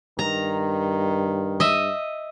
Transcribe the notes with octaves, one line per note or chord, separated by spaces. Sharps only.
G2 D#3 A#5
D#5 E5